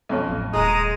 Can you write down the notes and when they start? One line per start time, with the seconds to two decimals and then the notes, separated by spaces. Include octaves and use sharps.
0.09 B1 F2 C#4
0.28 A1
0.53 D#1 G#3 A#5 D#6